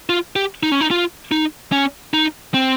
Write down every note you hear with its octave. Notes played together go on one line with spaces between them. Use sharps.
F4
G4
D#4
C#4
D#4
F4
D#4
C#4
D#4
C4